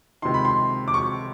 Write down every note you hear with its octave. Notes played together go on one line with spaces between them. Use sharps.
C#2 C3 D#3 C6
B5
C6
D6
C#6